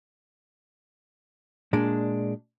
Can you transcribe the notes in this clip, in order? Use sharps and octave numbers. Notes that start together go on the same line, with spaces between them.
A#2 G#3 D4